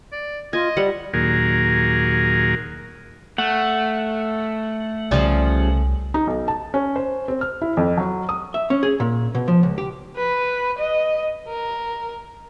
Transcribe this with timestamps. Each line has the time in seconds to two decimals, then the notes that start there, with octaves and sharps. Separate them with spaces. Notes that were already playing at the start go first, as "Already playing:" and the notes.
0.12 D5
0.53 F4 D#5 G#5
0.77 G3 D5 F#5
1.14 D#2 A#2 F#3 G#4 A#4
3.38 A3 F#5
5.11 C2 C#3 F3 G3
6.14 D#4
6.27 B1
6.48 A5
6.74 C#4
6.96 C5
7.28 C4
7.41 F6
7.62 E4
7.77 F2
7.97 F#3
8.29 D#6
8.54 E5
8.70 C#4
8.83 G#4
9.00 A#2
9.35 B2
9.48 F3
9.63 C#2
9.78 G4
10.16 B4
10.78 D#5
11.48 A#4